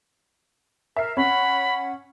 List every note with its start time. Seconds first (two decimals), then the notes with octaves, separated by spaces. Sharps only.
0.96 A#4 E5 C7
1.17 C#4 F#5 B5